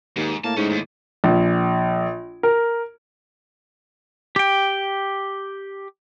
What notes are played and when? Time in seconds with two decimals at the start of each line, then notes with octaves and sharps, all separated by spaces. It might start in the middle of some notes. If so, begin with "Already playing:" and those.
0.16 D#2 G#2
0.44 A2 A#3 A5
0.57 G#2 C#4 D#4
0.70 D#2
1.24 A#1
2.43 A#4
4.36 G4 G5